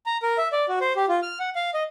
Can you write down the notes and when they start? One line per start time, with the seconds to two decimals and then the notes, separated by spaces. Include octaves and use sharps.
0.06 A#5
0.23 A#4
0.38 E5
0.52 D5
0.69 F#4
0.81 C5
0.96 G4
1.08 F4
1.23 F6
1.40 F#5
1.56 F5
1.74 D#5